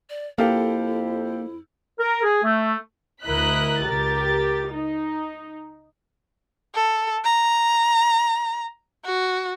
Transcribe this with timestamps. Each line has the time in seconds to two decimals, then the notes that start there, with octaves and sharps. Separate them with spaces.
0.09 D5
0.38 F2 A#3 E4 G4 A4 F5
1.99 A#4
2.23 G#4
2.44 A3
3.25 D2 E4 A#4 D#5 F#6 B6
3.82 C#2 G4 A#4 A6
4.71 D#4
6.75 A4
7.24 A#5
9.05 F#4